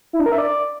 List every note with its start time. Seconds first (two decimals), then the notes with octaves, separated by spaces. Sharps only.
0.13 E4
0.19 D4
0.26 A#4
0.32 E5
0.38 D5